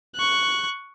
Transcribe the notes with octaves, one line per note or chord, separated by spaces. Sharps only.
C#6 F#6